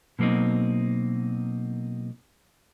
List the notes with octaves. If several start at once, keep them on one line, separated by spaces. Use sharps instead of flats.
B2 F#3 A#3 C4 D#4